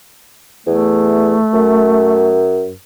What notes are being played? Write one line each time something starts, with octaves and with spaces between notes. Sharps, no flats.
E2 A3
F#2